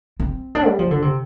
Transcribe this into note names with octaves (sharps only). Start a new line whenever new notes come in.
C4
D4
G3
F3
D3
C3